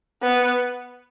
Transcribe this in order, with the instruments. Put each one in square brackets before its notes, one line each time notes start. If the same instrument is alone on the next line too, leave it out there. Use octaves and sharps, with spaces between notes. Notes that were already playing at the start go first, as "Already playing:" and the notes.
[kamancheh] B3